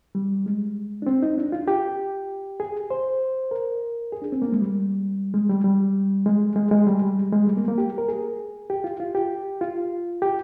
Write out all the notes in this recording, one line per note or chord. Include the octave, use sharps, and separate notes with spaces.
G3
G#3
D4
C4
D#4
D4
F4
G4
G#4
C5
A#4
G#4
D4
C4
A#3
G#3
G3
G#3
G3
G3
G#3
G#3
G#3
G3
G3
G#3
G3
A#3
A#3
G4
A#4
G#4
G4
F4
F4
G4
F4
G4